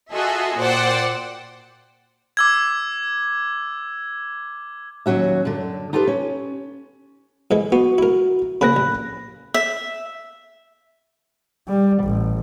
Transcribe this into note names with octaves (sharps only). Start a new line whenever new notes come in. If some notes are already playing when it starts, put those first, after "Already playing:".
F4 F#4 G#4 A4 D#5 E5
A#2 C5 D5 F#5 G5
D6 E6 G#6
D#2 F#3 C#4 F#4 E5
F#2 D3
D#4 F4 G4 A4 B4
C#4
G#2 E3 G#3
B3 F#4
E4 A#4
C#3 A#3 C4 B5 F#6 A#6
A1
E5
G3
A1